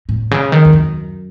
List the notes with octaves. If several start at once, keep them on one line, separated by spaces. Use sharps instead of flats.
A2
C#3
D#3
E2
F#2